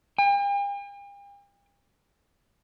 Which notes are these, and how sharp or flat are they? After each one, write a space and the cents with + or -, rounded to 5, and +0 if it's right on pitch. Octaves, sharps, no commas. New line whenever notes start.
G5 +45